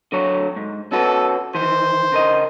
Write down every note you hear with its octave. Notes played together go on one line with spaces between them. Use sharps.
D3 F#3 C#5
G#2
C#4 F#4 A4 B4
D#3 E3 C5
C#3 A#4 D#5